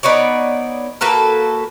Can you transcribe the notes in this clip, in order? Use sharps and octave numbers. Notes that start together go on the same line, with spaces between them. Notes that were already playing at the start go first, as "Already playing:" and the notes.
B3 D#4 C#5 D5
A#3 F#4 A4 B4